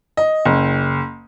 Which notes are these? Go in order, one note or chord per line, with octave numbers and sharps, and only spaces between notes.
D#5
F#1